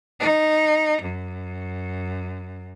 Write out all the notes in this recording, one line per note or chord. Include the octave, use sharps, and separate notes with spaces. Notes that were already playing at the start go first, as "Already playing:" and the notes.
D#4
F#2